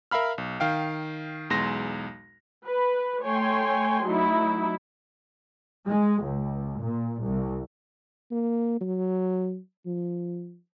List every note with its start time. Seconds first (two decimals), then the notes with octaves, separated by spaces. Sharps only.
0.11 A#4 E5 F5 B5 F6
0.38 B1
0.60 D#3 F5 G5
1.50 B1 E2 G#3 C6 A#6
2.66 B4
3.23 A3 C#5 G5 G#5 C6
4.04 F#3 A3 D#4 E4
5.88 G#3
6.23 C#2
6.81 A#2
7.24 C2
8.31 A#3
8.81 F#3
9.86 F3